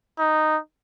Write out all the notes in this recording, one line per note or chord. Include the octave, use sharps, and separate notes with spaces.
D#4